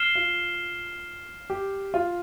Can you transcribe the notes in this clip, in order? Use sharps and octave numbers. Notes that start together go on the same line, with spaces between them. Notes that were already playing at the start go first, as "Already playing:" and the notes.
Already playing: F6 C7 E7 G7
F4
G4
F4